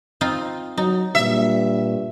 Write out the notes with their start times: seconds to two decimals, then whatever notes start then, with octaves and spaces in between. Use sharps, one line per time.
0.21 C4 D#4 F4
0.77 F#3 D#4
1.15 G2 A#2 E5